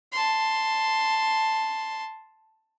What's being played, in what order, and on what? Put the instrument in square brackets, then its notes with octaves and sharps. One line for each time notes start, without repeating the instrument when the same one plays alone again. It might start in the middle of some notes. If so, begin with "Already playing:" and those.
[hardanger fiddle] A5 C6